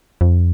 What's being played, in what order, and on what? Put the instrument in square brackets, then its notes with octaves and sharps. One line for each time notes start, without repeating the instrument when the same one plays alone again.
[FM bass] F2